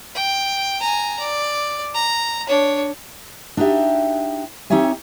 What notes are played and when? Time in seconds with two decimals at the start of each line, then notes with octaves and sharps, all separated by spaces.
0.15 G5
0.80 G#5 A#5
1.19 D5
1.94 A#5
2.48 D4 C#5
3.57 D4 D#4 F#4 G4 E5
4.70 C4 D#4 G4 C#5 E5 G#5